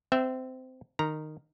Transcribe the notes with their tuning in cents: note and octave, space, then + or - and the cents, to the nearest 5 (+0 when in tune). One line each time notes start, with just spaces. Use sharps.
C4 -20 E5 +0
D#3 -15 A#5 +0